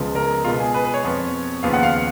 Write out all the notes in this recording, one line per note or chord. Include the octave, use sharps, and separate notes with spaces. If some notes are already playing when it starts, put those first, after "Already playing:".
Already playing: C#2 C#3 F3 G#3 B3
A#4
B2 G#3 B3 F4
G#4
B4
B4
C#5
F2 F3 B3
D#2 C#3 F3 B3 F5
F#5
F5